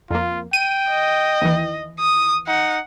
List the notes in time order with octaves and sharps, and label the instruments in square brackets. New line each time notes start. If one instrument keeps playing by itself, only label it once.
[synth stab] F2 A#3 [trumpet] F4
[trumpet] G5 [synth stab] D#7
[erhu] D#5
[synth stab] D#2 E3
[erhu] D#6
[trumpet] D#4 [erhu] F#5